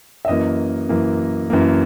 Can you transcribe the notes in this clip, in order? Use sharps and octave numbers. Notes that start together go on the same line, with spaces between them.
E5
F#2 E3 A#3 D#5
F#2 E3 A#3
F#2 E3 A#3